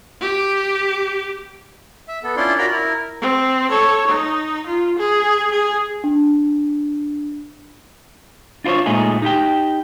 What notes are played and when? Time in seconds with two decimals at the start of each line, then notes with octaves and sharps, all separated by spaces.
0.21 G4
2.08 E5
2.24 B3 A4
2.37 C#4 D4 E4 F4 D5 C6
2.58 F4 F#4 A#4 D5 A#5 B5
2.71 E4 A#4
3.21 C4
3.69 A4 C#5
4.07 D#4
4.66 F4
4.98 G#4
5.50 G#4
6.04 D4
8.64 D4 F4 A#4 C5 C#5
8.86 A#2 G#3 A3 D#4 G#4
9.22 D#4 G4 G5